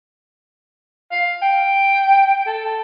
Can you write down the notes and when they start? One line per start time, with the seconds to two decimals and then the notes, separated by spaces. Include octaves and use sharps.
1.11 F5
1.42 G5
2.46 A4